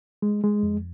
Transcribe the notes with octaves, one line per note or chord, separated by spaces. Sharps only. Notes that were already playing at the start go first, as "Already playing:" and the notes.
G#3
G#3
F2